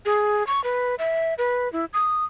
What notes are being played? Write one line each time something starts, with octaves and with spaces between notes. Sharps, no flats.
G#4
C#6
B4
E5
B4
E4
D#6